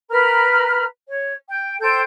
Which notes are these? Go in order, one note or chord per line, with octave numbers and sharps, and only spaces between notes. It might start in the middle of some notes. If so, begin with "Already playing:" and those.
A#4 B4 A#5 F6
C#5
G5
A4 C5 G5 G6